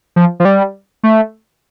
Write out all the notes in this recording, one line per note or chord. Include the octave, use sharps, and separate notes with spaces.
F3
F3
G3
A3